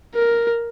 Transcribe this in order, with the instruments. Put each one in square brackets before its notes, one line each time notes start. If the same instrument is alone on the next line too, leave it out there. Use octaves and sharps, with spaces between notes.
[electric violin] A#4